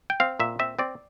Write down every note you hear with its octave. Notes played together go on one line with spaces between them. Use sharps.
G5
C4 F5
A#2 E5
C4 E5
C4 D5